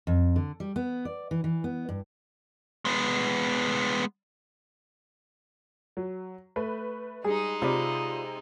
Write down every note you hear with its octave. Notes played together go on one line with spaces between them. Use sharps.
F2
D3
G3
B3
D5
E3
E3
B3
G2
G#3 B3
F#3
A3 B4
G3 G#3 D#4 G#4
C3 C4 F4 B4 D5